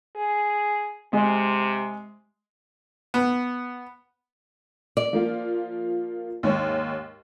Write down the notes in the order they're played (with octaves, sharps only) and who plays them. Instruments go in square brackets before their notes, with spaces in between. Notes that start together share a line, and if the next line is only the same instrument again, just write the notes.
[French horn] G#4
[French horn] C3 [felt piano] G#3
[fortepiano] B3
[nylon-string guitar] D5
[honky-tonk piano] F3 A#3 F4
D#2 G#2 C#5